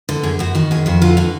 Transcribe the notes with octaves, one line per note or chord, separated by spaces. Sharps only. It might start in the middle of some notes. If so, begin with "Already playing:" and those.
D3
F#2 G#4
F#2 F#4
D#3 F#4
F#2 G#4
F2 F#4
D3 F4
D3 F#4